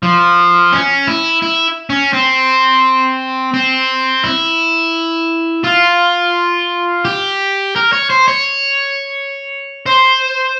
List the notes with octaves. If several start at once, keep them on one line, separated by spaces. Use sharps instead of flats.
F3
C#4
E4
E4
C#4
C4
C4
E4
F4
G4
A#4
C#5
C5
C#5
C5